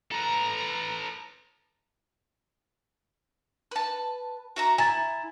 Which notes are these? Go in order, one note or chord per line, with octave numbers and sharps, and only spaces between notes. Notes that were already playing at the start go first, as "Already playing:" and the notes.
A4 B4 A#5
B4 A5
F#4 E5 A#5
E4 G#5 A#5 A6